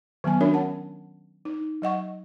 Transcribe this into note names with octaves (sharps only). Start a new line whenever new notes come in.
D#3 F#3 B3 G#5
C#4 D4 F#4 A#4 C#5 E5
F#5 A5
D#4
F#3 D#5 F#5 C#6